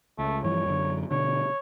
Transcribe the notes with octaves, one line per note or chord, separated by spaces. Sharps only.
C#2 A3
G2 E3 F3 C#5
F#2 D3
B2 D3 C#5